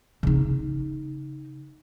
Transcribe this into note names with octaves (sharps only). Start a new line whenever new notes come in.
C#3 D#4